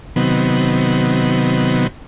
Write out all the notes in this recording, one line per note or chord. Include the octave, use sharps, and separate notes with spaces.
C3 D#3 F#3 B3